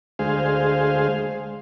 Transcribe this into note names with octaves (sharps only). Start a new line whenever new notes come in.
D2 G#3 G#4 C5 F5